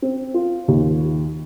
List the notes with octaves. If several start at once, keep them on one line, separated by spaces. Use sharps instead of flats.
C4
F4
D#2